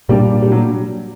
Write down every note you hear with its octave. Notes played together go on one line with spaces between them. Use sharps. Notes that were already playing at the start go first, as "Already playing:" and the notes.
A#2 G3 A#3 D4
G3
F#3